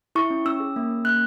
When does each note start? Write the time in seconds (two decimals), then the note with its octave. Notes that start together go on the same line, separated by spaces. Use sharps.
0.15 E4 C#6
0.30 C#4
0.46 C#4 E6
0.60 G#4
0.76 A#3
0.90 C#4
1.05 A#3 F#6